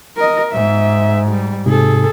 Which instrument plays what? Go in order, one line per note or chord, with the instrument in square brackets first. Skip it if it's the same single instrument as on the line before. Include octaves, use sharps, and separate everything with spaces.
[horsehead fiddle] A#4 D#5
[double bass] G#2 [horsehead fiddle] E5
[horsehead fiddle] G3
[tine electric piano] G#2 C3 [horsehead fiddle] G#4 A4